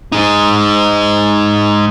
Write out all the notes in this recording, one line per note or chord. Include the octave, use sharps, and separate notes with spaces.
G#3 D#4